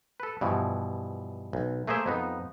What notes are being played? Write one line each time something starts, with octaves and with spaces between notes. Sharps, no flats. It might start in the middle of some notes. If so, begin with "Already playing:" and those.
A4 B4
G2 B2 E3 F3
B1
A3 A#3 G#4 A#4 C5 E5
F2 B3 D#4